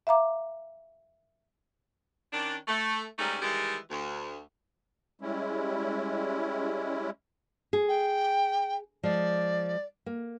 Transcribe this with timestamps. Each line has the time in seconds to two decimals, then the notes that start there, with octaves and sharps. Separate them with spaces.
0.07 E5 F5 A#5 D6
2.33 D#3 C#4 D4
2.68 A3
3.19 G#2 G3 A3 C#4 D#4
3.42 D#3 E3 G3 G#3
3.90 D2
5.21 G3 G#3 C#4 E4
7.73 G#4
7.88 G5
9.03 F3 G#3 D5
10.06 A#3